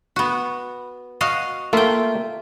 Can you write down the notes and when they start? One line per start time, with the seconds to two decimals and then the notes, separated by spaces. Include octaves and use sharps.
0.16 B3 F#4
1.21 F#4 D#5 F5
1.73 A3 A#3 F4 E5 G5